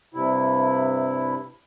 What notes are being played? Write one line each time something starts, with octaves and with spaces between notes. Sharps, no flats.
G2 C3 E4